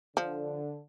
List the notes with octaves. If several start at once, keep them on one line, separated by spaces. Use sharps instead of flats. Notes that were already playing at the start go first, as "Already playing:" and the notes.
D3 F3